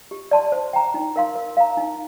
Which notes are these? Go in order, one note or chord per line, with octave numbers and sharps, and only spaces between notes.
G4
D5 A5 C6
C5
G5 A#5
D#4
A#4 F5 C6
A#4
F5 A#5
D#4